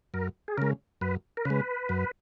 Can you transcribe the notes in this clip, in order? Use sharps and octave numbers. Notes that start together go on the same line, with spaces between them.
F#2 A#4
G#4
C#3 G#3 A#4
F#2 B4
A#4
C#3 G#3 B4
F#2